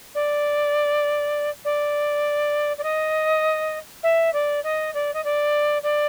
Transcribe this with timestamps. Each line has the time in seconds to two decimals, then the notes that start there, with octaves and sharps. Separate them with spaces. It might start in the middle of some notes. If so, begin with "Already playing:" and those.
0.15 D5
1.65 D5
2.78 D5
2.83 D#5
4.03 E5
4.33 D5
4.64 D#5
4.94 D5
5.14 D#5
5.24 D5
5.83 D5